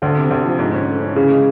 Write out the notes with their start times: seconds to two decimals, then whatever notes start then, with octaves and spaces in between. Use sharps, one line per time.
0.02 D2 D3
0.16 C3
0.31 D2
0.45 F3
0.59 G#2
0.74 C#4
0.88 A3
1.02 C#4
1.16 C#3 E3
1.30 G#3